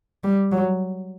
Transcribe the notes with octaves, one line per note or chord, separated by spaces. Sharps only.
G3
F#3